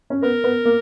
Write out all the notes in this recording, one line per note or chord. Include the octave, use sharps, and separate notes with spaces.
C#4
B3 A#4
B3
A#3